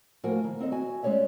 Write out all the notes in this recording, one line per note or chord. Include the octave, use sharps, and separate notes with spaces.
A2 F3 A#3 F#4 A#4 G#5
D#3
D#2 C4 A4 D#5
F#4 G#5
G#3 C#4 G4 C#5 D5 E5